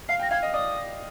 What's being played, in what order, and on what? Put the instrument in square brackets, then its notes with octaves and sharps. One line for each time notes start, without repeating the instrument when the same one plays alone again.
[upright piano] F5 [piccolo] C7
[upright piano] G5 [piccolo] A#6
[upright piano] F5 [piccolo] G#6
[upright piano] D#5
[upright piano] D5 [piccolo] D#6